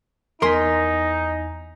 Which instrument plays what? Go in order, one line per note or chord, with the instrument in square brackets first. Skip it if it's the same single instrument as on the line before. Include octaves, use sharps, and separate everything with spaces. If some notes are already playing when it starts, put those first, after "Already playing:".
[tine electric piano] E2 G#5 B6 [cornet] D#4 [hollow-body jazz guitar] A#4 C6